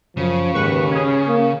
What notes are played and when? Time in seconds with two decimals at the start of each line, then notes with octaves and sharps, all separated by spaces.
0.17 F#2 C#3 F3
0.54 D#2 G#2 B4 C#6
0.90 C#4 G#4
1.28 A#3